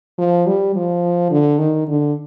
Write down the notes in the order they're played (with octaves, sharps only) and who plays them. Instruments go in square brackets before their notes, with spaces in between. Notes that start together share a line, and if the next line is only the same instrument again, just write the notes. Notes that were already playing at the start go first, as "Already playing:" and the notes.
[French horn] F3
G3
F3
D3
D#3
D3